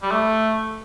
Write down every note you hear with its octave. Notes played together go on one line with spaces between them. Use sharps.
G3
A3